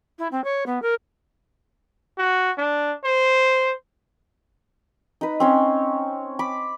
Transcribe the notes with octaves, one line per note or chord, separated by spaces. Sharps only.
E4
C4
C#5
B3
A#4
F#4
D4
C5
D#4 B4
C4 C#4 C#5
B5 D6